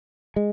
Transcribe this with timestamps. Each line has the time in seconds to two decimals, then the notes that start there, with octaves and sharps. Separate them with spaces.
0.36 G#3